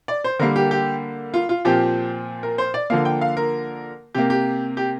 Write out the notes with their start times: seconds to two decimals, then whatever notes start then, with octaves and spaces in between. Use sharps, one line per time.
0.08 D5
0.24 C5
0.39 D3 G3 A#3 A#4
0.56 G4
0.71 G4
1.34 F4
1.49 F4
1.65 A#2 F3 C4 G4
2.43 A#4
2.58 C5
2.74 D5
2.90 D3 F3 A#3 F5
3.05 G5
3.21 F5
3.37 A#4
4.15 C3 A#3 G4
4.30 G4
4.77 G4